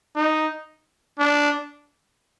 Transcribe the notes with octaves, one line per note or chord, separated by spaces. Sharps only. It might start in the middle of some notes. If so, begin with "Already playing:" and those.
D#4
D4